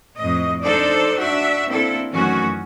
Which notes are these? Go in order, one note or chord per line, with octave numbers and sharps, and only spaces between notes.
F2 A2 D#5
D4 D#4 A4 C5 D5
D4 F#4 E5
A#3 C4 D4 E4 A4
F#2 D#3 E3 A3 C#4 F#4